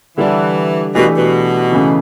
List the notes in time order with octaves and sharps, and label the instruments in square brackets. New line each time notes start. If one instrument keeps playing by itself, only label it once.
[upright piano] D3 G3 D4 G4 [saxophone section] E3
[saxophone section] B2 [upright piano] E3 A3 D4 G4
[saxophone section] B2
[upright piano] C#3 E3 A3